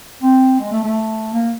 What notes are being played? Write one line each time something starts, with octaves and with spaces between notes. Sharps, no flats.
C4
G#3
A3
A3
A#3